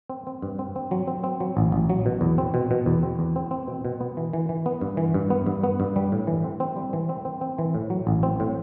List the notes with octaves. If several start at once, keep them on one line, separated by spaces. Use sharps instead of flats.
C4
C4
G2
C4
C4
F#3
C4
C4
F#3
A1
A1
F#3
B2
E2
C4
B2
B2
E2
C4
E2
C4
C4
B2
B2
B3
E3
E3
E3
B3
G2
E3
G2
B3
G2
B3
G2
G3
A2
E3
C4
C4
G3
E3
C4
C4
C4
E3
A2
F#3
A1
C4
A2